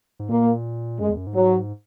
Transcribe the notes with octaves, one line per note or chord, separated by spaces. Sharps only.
G#2
A#2 A#3
F#2 G#3
E2
F#2
G#2
F#3